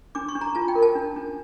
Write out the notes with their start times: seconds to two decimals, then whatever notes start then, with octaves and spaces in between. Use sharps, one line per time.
0.15 D4 D6
0.29 C#6
0.35 D4
0.41 A#5
0.55 F4 A5
0.68 G5
0.75 A#4
0.82 A5
0.95 D4
1.16 D4